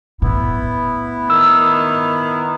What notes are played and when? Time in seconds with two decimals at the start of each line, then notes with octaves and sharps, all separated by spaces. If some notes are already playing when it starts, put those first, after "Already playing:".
0.22 A2 B3 E4
1.30 D#3 E6